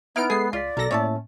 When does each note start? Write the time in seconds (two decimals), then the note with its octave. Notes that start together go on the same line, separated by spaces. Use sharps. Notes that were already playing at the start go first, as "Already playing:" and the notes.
0.16 B3 D#4 E4 F6 D7
0.30 G#3 G#4 A4 C7
0.53 C#2 F4 D5 B6
0.77 B1 B2 A4 A#4 A#6
0.91 A2 A#3 C#4 C#5 E5 A5